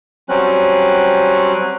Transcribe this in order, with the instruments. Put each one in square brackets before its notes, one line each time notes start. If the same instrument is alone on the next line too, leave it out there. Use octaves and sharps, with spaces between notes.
[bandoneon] F#3 G3 C4 C#4 F#6